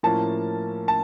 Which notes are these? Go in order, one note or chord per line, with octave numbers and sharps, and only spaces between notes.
A2 F3 A#3 C#4 A5
A5